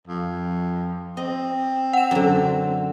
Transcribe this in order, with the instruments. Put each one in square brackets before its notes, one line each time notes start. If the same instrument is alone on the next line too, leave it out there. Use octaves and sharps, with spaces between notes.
[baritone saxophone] F2
[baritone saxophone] C4 [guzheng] D#5
[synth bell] F#5 E7
[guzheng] F#2 D3